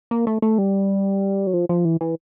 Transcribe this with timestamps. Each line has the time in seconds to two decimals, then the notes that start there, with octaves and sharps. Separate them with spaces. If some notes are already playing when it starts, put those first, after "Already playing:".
0.11 A#3
0.27 A3
0.42 A3
0.58 G3
1.47 F#3
1.53 F3
1.69 F3
1.85 E3
2.01 E3